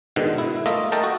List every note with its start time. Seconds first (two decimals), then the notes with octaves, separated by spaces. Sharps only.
0.16 G#2 B2 D3 D#3
0.38 E4
0.66 A3 A#3 F4 D#5 E5
0.92 A3 A#4 D#5 G5 A5
1.03 F#4